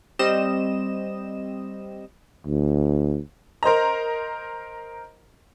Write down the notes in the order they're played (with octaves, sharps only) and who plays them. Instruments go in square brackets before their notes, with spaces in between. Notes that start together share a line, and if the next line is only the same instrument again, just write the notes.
[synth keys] G3 C4 D#5 E7
[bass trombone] D2
[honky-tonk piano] A#4 C5 D#5 A#5